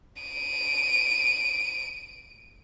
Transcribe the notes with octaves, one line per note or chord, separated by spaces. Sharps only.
D7 D#7